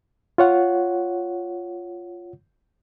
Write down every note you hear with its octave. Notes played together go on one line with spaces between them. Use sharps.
F4 C#5 F#5